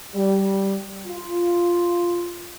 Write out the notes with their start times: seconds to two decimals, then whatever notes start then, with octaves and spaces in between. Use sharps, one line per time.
0.14 G3
1.06 F4